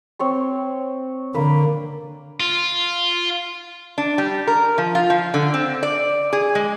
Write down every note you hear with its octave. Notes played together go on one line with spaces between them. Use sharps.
C4 C#5 C6
D3 A#3 B4
F4
D4
G3
A#4
F3
F4
F3
D3
C4
D5
G#4
G#3